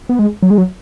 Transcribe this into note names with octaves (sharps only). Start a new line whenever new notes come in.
B3
G#3
F#3
G#3
F#3